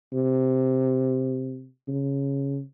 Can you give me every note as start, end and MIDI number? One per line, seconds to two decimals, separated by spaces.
0.13 1.68 48
1.88 2.62 49